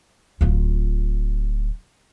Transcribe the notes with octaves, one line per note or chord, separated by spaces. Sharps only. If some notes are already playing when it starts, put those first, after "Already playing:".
D1 F4